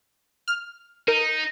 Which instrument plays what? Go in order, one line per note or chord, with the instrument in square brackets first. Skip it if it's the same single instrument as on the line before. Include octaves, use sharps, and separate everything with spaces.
[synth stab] F6
[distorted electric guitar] D#4 [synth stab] A#4